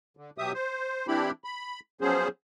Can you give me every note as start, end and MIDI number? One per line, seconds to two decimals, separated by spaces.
0.17 0.30 50
0.38 0.52 47
0.38 0.52 54
0.38 0.52 67
0.38 0.52 76
0.38 0.52 87
0.54 1.07 72
1.08 1.31 52
1.08 1.31 60
1.08 1.31 62
1.08 1.31 64
1.08 1.31 67
1.08 1.31 83
1.44 1.80 83
2.01 2.28 53
2.01 2.28 54
2.01 2.28 59
2.01 2.28 61
2.01 2.28 68
2.01 2.28 72